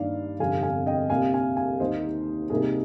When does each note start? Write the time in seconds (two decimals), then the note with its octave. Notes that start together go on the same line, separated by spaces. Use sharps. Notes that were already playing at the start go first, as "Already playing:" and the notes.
Already playing: G2 D#3 A#3 D#4 D5 F5
0.39 G1 F2 C3 G3 F5 G#5
0.63 F5 G#5
0.86 D#5 G5
1.10 C2 A#2 G3 F5 G#5
1.34 F5 G#5
1.57 F5 G#5
1.80 D#2 D#3 A#3 D#4 C5 D#5
2.50 C2 C3 G3 A#3 D#4 G#4